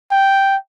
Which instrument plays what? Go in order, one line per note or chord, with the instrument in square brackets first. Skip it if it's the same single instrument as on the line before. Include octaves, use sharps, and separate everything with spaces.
[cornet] G5